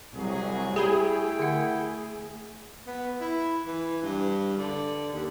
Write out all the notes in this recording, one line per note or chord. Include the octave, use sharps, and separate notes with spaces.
C2 C3 F#3 G#4
A3 E4 G4 G#4 G5 B5
D3 F#5
B3
E4
E3
G2
D3
D#2